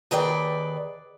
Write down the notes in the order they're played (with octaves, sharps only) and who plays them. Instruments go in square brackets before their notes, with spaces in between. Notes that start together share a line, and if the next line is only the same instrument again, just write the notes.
[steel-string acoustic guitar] D#2 D#3 G#4 B4 D5 G5